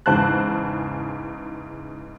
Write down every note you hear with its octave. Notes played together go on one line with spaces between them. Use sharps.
E2 G#2 C#3 C5 A5 F#6